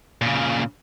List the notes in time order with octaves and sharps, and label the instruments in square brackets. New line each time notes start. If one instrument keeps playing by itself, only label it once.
[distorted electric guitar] A#2 C#3